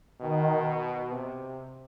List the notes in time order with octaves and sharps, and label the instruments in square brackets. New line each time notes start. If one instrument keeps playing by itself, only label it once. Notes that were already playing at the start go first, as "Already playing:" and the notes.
[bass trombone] B2 [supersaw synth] D#3
[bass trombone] C3